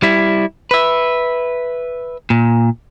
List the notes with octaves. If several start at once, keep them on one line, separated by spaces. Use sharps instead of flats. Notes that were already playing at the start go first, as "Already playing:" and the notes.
G3 E4
B4 E5
A#2